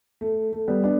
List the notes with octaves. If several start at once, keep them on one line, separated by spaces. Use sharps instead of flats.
A3
A3
G3 B3
B3 D4